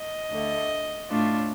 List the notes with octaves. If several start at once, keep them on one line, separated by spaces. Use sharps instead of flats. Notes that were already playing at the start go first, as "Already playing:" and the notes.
Already playing: D#5
D2 D3 A3
A2 A3 D4 F4